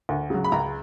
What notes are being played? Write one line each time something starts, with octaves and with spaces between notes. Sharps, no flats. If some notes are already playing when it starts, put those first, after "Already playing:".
D2
C#3 F#3
B5
C#2 A#5